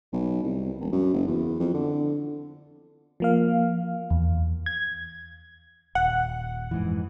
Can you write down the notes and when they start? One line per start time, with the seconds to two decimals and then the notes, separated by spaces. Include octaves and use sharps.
0.13 B1
0.43 C2
0.80 E1
0.92 F#2
1.14 F#1
1.27 E2
1.60 F2
1.74 D3
3.20 F3 A#3 F5
4.10 E2
4.66 G#6
5.95 D#1 F#5
6.71 F2 G#2 E3